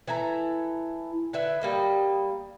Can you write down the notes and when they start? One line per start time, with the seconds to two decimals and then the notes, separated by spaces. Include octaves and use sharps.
0.07 E3 E4 A4 A#5
1.33 D3 E4 B4 E5
1.61 G3 A#3 D#5